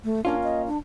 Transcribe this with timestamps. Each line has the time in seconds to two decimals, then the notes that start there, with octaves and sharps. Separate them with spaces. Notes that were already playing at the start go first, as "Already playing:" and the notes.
0.04 A3
0.25 A#3 C#4 D4 F4
0.43 D#5
0.67 D4